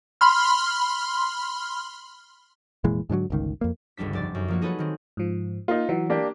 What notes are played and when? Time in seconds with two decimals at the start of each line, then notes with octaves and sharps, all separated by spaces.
0.21 B5 C6 F6
2.84 F1 A#2 E3 G#3
3.10 G#2 D3 E3 F#3
3.30 G1 C#2 D#3
3.61 F2 A#3
3.97 G1 C#2 G3 D4 B6
4.13 F1 D4 D5 A6
4.35 F#2
4.48 F3 A#3 F#4
4.61 D#4 G#4 A4 B4 C#5 F#5
4.79 D#3 C4
5.17 G#2 F3
5.68 A#3 D#4 F4
5.89 E3 F#3
6.10 A#3 D4 G4